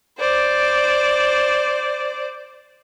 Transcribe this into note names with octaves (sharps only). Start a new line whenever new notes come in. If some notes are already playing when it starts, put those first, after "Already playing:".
C5 D5